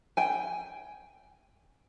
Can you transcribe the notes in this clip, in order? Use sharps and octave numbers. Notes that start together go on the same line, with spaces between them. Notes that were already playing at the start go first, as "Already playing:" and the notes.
G5 G#5